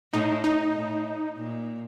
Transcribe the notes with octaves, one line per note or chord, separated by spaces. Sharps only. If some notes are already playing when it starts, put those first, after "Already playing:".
A2 D#4
D#4
A2
A#2